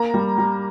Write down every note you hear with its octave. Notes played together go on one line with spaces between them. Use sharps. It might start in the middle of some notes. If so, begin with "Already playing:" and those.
Already playing: A#3 A#5
G3
G3